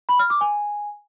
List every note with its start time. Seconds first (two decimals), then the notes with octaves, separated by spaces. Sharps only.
0.09 B5
0.19 F6
0.30 D6
0.41 G#5